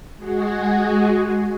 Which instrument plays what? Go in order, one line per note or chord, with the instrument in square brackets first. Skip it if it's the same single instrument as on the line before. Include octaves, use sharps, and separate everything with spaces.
[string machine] G#3 F#4 G#4